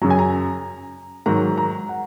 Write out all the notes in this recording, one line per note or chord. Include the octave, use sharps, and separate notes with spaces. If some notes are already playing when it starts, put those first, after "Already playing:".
F#2 C#3 F#3 A#5
G#5
A#5
G#2 D#3 F#3 A#5
A#5
F#5